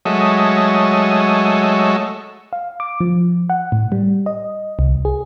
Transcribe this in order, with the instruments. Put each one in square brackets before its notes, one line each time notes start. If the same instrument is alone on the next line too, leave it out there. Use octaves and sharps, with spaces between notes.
[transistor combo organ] F#3 G#3 A3 C#5 D#5 E5
[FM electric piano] F5
D6
F3
F#5
A2
G3
D#5
C2
G#4